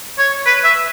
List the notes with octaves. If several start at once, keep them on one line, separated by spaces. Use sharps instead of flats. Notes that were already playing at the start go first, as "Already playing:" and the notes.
C#5
B4
E5